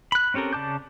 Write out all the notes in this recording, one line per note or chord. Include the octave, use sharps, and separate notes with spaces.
B5 F#6
C4 C#4 G4 A4 A#4
C#3 D5 A5 D6 G6